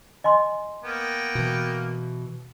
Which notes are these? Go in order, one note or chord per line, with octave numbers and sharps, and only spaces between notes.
D#5 G#5 C6
A#3 B3 G5
B2 E3